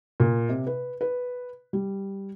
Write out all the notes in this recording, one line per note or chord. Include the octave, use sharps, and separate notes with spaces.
A#2
C3
B4
B4
G3